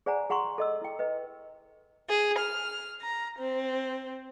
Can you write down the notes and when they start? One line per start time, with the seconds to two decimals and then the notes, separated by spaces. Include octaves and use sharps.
0.06 G#4 C5 D5 F#5 G#5 A#5
0.30 G#4 F#5 A#5 C6 C#6
0.58 A4 D#5 E6
0.82 E4 G5
0.99 B4 D#5
2.09 G#4
2.38 F6
3.01 A#5
3.38 C4